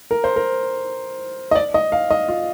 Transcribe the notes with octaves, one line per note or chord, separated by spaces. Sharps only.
A#4
C5
A#4
D#5
D5
D#5
F5
D#5
F4